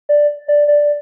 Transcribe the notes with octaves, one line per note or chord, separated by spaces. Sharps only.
D5
D5
D5